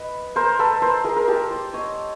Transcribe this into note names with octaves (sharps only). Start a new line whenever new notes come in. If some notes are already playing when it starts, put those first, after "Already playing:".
Already playing: B4 D#5
A#4 C5
A4 B4
A#4 C5
G#4 A#4
A#4
G4 A4
C5 D5
C#5 D#5